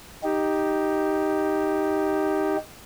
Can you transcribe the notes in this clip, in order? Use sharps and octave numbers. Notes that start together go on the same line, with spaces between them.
D#4 G4